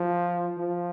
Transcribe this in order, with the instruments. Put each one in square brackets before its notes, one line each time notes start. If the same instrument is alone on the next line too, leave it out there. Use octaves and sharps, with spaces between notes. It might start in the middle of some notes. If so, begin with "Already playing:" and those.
Already playing: [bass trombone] F3
F3